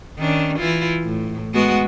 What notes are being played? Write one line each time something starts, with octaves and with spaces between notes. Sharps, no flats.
D#3 C#4 D4
E3 E4 F4
A2
G#3 B3 F#4